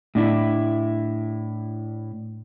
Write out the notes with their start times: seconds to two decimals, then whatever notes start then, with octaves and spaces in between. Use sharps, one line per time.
0.15 A2 D4 E4